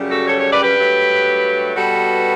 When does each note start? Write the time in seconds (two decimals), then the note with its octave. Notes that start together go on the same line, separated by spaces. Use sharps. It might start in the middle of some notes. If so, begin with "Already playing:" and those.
Already playing: F#2 C#3 G3
0.08 F#4 A4
0.26 A4 C#5
0.38 A4 C#5
0.50 B4 D5
0.63 G4 B4
0.76 G2 F#3 A3
1.74 B2 G3 B3 F#4 A4